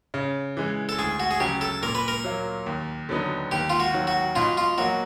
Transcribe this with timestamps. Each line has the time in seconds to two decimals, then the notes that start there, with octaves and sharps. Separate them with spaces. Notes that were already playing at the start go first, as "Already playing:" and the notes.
0.14 C#3
0.57 E3 G#3
0.89 A4
0.98 D2 G#4
1.20 F#4
1.31 G#4
1.40 C#3 F#3 G4
1.61 A4
1.82 A#2 A#4
1.95 B4
2.08 A#4
2.24 F#3 A#3
2.66 D#2
3.09 D3 F#3 B3 D#4
3.51 D#2 G4
3.70 F4
3.80 F#4
3.94 D#3 F#3
4.07 F#4
4.36 B2 F4
4.57 F4
4.78 F#3 A#3 F#4